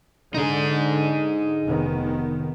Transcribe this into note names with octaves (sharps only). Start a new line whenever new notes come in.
D3 D#4 G#4
F1 D#3 B3